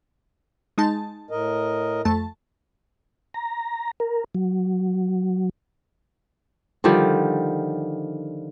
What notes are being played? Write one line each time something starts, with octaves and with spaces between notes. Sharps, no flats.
G#3 D#4 A5
A2 A#4 D#5
F2 A3 A5
A#5
A#4
F#3
D3 D#3 F3 G3